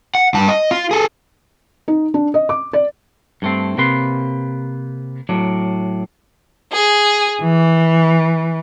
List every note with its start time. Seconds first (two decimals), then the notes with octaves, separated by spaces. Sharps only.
0.15 F#5
0.34 G2 A5
0.48 D#5
0.71 F4
0.91 G#4 A4
1.88 D#4
2.14 D4
2.34 D#5
2.49 D6
2.73 D5
3.42 G2 A3 C4
3.78 C3 A#3 B4 C6
5.29 A2 F#3 D4
6.71 G#4
7.41 E3